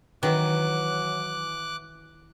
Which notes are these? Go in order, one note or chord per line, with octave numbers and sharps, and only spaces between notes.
D#3 E3 F#3 D6 F#6